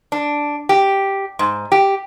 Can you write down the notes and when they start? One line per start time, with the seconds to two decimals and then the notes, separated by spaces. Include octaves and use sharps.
0.12 D4
0.69 G4
1.39 G#2
1.72 G4